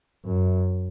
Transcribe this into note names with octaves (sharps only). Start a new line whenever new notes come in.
F#2